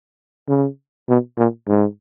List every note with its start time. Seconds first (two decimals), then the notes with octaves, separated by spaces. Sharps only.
0.48 C#3
1.08 B2
1.37 A#2
1.67 G#2